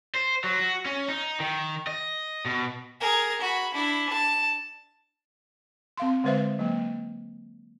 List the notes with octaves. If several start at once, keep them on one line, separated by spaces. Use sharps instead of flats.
C5
F#3
F#4
C#4
D#4
D#3
D#5
B2
G#4 A#4
F#4 B5
D4 E4
A5
C4 F5 C6
D3 G#3 B4 C5 E5 F5
F#3 A#3